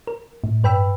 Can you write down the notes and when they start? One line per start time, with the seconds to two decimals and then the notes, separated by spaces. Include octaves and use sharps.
0.07 A#4
0.44 A2
0.64 G2 B4 G5 B5 E6